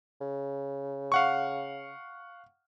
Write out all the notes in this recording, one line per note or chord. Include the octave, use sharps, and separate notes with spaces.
C#3
F5 F#5 C#6